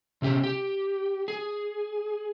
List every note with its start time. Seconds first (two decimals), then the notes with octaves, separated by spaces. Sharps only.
0.22 C3 C#4 G4
0.44 G4
1.28 G#4